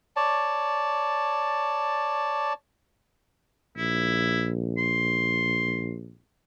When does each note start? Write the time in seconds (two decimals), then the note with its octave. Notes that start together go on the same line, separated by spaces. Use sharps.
0.16 C#5 D5 A5
3.77 A#1 E4
4.78 C6